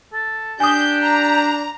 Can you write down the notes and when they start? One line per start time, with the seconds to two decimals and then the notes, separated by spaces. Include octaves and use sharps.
0.13 A4
0.60 D4 G4 G#5 D#6 G6
1.02 A#5